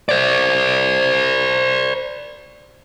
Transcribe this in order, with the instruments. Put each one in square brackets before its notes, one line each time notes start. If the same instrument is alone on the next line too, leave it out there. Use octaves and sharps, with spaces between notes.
[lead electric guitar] C5 D5